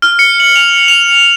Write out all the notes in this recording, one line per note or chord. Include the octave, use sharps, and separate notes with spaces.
F6
C#7
F#7
F7
F7